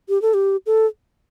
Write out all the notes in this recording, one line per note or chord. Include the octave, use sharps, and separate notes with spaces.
G4
A4
G4
A4